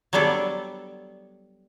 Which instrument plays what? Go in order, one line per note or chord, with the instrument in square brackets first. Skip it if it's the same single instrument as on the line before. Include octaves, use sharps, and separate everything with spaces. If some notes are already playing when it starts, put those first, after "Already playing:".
[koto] F#3 G3 B3 D4 A4 D5